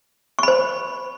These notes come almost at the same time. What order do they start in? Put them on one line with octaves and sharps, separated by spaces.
C#6 B5 C5